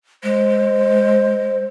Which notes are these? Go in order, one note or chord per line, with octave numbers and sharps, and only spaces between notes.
G#3 C5